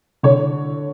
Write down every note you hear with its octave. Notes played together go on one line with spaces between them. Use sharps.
D3 C#5